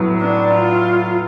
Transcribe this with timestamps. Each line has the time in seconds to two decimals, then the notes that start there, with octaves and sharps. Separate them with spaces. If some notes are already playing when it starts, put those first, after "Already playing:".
Already playing: A2 F#3 B3
0.20 D4
0.50 F4